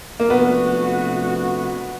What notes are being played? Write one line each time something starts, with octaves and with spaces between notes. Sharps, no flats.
A#3
C3 F3 A3 B3 D4 F#4